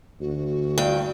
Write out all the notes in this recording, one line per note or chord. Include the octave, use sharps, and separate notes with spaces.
D2 F#4
G2 G5